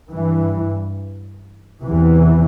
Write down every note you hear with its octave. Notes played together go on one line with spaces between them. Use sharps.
G2 E3
E2 C3 E3